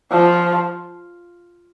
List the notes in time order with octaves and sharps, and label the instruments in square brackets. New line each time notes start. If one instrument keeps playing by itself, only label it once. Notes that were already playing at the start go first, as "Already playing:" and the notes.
[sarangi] F3